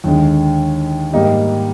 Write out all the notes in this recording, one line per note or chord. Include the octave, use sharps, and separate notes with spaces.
D#2 D3 G#3
G#2 G3 A#3 D#4 G4